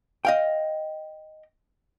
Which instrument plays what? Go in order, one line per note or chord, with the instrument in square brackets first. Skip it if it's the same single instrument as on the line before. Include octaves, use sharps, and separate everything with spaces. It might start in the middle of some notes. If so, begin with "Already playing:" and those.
[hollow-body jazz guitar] D#5 F5 G5